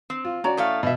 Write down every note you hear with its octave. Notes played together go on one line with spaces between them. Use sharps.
C4
F4
C#4 F#4 C#5 D5 A#5
A2 A3 F5
B2 E5